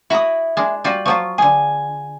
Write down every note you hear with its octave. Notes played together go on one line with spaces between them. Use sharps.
E4 F#4 A#5 D#6
G#3 D4
G3 F4 F#4
F3 F#3 F4 C#6
D3 G#4 G#5